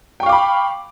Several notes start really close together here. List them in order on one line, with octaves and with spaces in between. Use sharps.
G5 C#6 F5 D6 B5